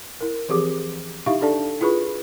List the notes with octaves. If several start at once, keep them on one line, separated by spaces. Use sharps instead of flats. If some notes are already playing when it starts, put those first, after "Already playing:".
E4 A#4
E3 F3 C4 G4 G#4 D6
D#4 E4 G4 E5 F5 C#6
D4 A4 D5 A5
E4 F4 G#4 B4 B5 C#6